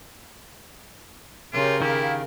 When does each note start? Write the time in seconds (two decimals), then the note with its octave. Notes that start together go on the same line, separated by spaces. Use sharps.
1.53 C#3 F4 G4 A#4 C#5 C6
1.82 D#3 E4 G4 F5